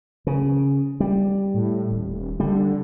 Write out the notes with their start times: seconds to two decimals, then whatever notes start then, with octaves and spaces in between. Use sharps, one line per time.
0.27 C#3
1.00 G3
1.54 A2
1.91 D#1
2.40 D3 G3